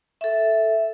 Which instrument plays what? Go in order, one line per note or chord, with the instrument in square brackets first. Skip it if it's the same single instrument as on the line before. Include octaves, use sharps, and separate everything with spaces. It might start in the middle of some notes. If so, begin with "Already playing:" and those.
[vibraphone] A4 E5